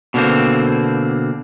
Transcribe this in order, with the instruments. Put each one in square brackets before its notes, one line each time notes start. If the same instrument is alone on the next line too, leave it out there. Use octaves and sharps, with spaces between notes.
[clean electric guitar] B2 D3 A#3 C4